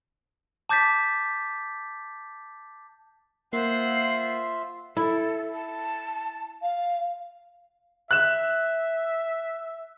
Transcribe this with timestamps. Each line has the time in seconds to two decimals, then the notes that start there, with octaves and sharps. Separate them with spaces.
0.69 A5 D6 G6 A6 B6
3.53 A#3 F4 C5 E5 F#5 C7
4.97 E4 A4
5.54 A5
6.62 F5
8.11 E5 F#6 E7